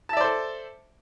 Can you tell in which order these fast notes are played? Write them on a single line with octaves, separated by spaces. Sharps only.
A5 E5 D5 C5 A4